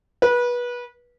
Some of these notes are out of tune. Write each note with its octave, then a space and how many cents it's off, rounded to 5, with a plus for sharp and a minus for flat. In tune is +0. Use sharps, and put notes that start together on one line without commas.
B4 -25